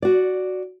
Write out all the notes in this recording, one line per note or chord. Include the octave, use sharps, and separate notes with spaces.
F#4 D5